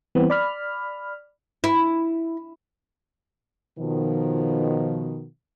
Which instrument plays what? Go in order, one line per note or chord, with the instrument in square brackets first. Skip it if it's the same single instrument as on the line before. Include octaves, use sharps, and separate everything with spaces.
[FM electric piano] E3 G3 B3 C4
D5 B5 F6
[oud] E4
[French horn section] B2 D#3 F3